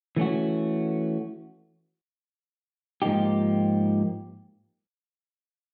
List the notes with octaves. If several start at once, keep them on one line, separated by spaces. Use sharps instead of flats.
E3 A3 C#4 F#4
G#2 F3 A#3 D#4 G4